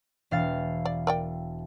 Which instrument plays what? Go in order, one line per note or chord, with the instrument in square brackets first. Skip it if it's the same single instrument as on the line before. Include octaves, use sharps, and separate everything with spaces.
[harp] E1 F5 A6
[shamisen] D5
A#4 D5 G5